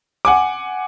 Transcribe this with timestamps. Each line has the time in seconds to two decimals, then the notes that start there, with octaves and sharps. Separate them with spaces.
0.25 F#5 G#5 D6